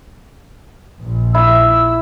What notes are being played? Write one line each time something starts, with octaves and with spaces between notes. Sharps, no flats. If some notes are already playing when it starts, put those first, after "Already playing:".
A#1
E4 E6